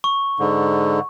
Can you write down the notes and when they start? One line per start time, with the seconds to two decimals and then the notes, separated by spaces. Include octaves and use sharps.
0.04 C#6
0.39 G#2 D3